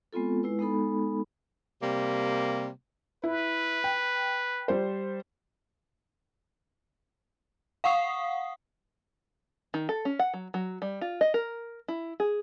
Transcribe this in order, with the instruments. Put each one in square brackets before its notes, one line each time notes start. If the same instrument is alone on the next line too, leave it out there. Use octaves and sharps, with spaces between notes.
[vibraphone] G#3 B3 C4 F4 A4
G#3 E4 B4
G#3 B3 D#4 A4 B5
[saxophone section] C3 G3 A#3
[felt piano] E4 [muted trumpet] B4
[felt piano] G5
G3 C5
[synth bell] F5 F#5 C#6 D#6 C7
[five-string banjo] D#3
A4
C#4
F#5
F#3
F#3
G3
F4
D#5
A#4
E4
G#4